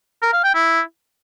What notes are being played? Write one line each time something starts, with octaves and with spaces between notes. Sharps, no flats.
A#4
F5
G5
E4